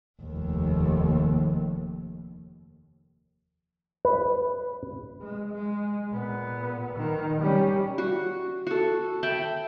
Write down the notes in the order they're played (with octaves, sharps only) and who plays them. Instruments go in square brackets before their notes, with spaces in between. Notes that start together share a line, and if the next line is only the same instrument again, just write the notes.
[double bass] F1 D#2
[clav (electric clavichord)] B4
[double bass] G#3
G#3
A#2 B3
D#3
G3 C#4
[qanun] F#4
F#4 A4
E5 G5 A5 B5